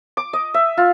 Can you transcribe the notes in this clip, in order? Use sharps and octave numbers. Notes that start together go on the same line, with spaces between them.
D6
D#5
E5
F4